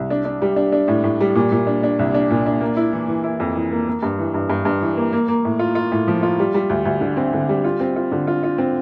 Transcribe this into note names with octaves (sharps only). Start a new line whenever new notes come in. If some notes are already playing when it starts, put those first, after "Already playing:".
Already playing: C2
D4
D4
G3
D4
D4
A2
A2
G3
A#2
A#2
D4
D4
C2
D4
A#2
D4
A#3
E4
E3
E3
E4
F2
E3
A#3
A#3
G2
E3
G2
G2
G2
E3
A#3
A#3
A#3
A2
F4
F4
A2
F3
F4
G3
G3
D2
D2
D3
C4
D3
G3
F4
C4
F4
D3
F4
F4
C4